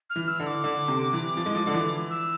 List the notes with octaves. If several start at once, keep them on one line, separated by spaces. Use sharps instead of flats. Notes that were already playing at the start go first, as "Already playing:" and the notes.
F6
E3
E6
D3
D6
D3
C3
E3
F3
G#3
F3
D3
E3
E6